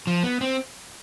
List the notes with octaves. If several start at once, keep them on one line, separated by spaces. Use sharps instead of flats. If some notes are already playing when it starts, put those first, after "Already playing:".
F3
B3
C4